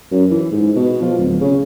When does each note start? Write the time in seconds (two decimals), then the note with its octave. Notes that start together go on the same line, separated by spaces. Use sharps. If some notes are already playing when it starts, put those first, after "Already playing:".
0.11 F#2
0.30 E3
0.52 G#2
0.76 B2
1.02 F3
1.19 D1
1.41 C#3